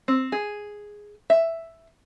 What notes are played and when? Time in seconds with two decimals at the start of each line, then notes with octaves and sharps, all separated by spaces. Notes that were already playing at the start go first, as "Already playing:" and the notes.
0.08 C4
0.32 G#4
1.30 E5